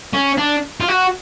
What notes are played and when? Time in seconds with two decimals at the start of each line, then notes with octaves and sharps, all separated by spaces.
0.13 C#4
0.38 D4
0.80 F4
0.88 F#4